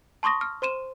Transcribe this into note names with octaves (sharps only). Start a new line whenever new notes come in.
A5 C6 C#6 D#6 A#6
F6
C5 C6 D#7 E7